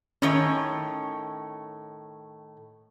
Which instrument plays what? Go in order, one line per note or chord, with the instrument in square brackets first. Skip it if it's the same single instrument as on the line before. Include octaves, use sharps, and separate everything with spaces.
[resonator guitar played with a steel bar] A2 D#3 C#5 [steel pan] C#4